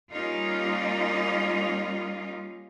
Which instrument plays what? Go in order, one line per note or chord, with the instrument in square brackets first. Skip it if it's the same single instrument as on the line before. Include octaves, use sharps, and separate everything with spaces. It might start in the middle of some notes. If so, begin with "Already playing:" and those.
[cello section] G3 A#3 C#4 D#4 F4